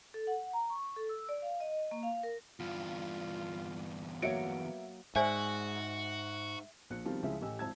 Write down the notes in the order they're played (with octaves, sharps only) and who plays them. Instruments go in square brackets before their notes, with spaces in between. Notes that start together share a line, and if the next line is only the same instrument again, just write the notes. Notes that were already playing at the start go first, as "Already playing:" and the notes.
[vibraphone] A4
F#5
A#5
C#6
A4
E6
D5
F5
D#5
A#3
F5
A#4
[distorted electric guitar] E2 G2 [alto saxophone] F4
[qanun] F#3 A#3 C#5 [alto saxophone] B3 [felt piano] E5 C#7 D7
[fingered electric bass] G#2 [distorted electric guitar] F#4 [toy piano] C5 D5 G#5 [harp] E5 G5 C#6
[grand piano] A#1 F#6 C#7
B2 D#3 F3 G3 C4 F4
C#2 C#3 F3 E4 G#4 E5
A1 A2 G4 D#5 G#5 E6
G#1 F2 E4 A5 E6 G#6